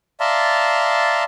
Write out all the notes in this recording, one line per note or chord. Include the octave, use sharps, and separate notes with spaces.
D5 E5 F5 A5 A#5 C6